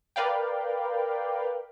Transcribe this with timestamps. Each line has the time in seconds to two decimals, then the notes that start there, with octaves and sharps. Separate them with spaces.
0.16 A#4 B4 D5 F5 G5